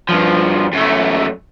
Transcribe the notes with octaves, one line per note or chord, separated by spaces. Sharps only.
G2 F3
F#2 A3